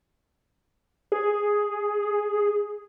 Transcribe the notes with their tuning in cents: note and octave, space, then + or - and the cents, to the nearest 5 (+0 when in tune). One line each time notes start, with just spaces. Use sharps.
G#4 +5